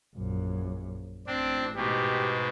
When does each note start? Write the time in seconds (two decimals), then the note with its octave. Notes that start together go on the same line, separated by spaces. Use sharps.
0.17 A#1 F#2
1.27 A1 C4 D4
1.75 G#2 B2 G4